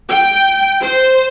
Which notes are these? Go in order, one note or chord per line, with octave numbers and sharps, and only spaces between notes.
G5
C5